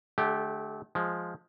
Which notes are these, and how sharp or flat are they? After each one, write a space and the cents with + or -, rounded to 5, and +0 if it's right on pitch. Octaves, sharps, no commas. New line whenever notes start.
D3 +0 A3 -35 G4 +0
F3 +5 G#3 +0